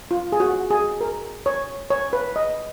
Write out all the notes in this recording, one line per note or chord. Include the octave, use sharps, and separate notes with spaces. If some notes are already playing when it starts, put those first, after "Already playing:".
F4
G#4
F#4
G#4
A#4
C#5
C#5
B4
D#5